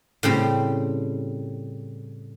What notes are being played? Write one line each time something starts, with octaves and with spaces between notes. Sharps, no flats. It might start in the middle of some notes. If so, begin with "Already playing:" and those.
A2 C#3 G3 C4